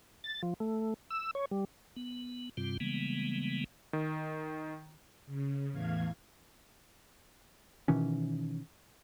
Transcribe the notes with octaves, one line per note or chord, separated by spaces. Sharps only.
A6
F3
A3
E6
C#5
G3
B3
G2 C3 G3 C4 F4
C#3 E3 G3 G#3 A#3 B3
D#3
C#3
E2 A2 E3 F5 G#6
B2 D#3 E3 C#4